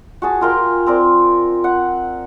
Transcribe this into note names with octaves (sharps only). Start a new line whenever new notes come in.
F#4 G#4 A5
F4 A#4 G5
C4 A#4 D5
F#5